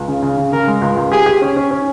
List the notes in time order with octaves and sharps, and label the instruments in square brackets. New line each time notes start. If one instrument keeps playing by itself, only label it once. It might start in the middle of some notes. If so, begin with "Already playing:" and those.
Already playing: [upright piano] C#2
C#3
C#3
C#3
[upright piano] C#3 [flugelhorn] A#4
[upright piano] G#3
C#2
C#2
[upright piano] G4 [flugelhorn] G#4
[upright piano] G4
C#4
C#4
C#4